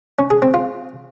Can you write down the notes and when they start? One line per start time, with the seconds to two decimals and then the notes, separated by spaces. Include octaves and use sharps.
0.19 C#4
0.30 G#4
0.42 C4
0.54 F4